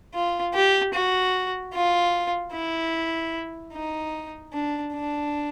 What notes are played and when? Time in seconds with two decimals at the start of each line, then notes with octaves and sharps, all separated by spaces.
0.14 F4
0.54 G4
0.94 F#4
1.73 F4
2.53 E4
3.73 D#4
4.53 D4
4.93 D4